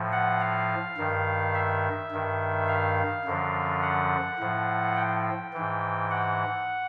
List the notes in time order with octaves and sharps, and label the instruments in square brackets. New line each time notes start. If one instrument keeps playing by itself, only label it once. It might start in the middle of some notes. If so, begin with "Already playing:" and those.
Already playing: [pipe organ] A2 F3
F#5
F5
G2 D#3
E5
G2 D#3
F5
F#2 D3 F3
F#5
A2 F3
G5
G#2 E3
F#5